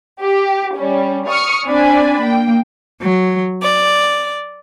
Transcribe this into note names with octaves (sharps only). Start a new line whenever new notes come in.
G4
G3 C#4
C#6 D#6 F6 C#7
C4 D4 D5 G#5 B5
A#3 G5
F#3
D5